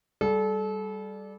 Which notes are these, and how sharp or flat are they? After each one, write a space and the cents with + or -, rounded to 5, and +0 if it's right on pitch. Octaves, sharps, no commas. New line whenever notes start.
G3 +0 A4 -30